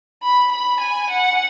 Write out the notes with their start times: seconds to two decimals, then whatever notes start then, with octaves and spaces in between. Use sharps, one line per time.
0.23 B5
0.52 B5
0.81 G#5
1.10 F#5